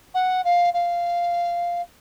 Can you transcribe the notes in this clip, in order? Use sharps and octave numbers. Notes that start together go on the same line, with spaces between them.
F#5
F5
F5